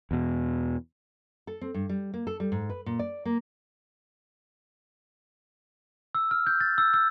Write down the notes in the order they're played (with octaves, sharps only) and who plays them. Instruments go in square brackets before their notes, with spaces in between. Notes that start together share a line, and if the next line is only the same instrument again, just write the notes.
[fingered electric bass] E2 B2
[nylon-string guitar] A4
C4
G2
G3
A#3
A4
G3
G#2
B4
A#2
D5
A#3
[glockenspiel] E6
F6
G6
A6
E6
E6